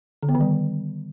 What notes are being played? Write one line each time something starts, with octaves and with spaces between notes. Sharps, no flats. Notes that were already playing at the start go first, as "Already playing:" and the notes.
D3
B3
D#3
G3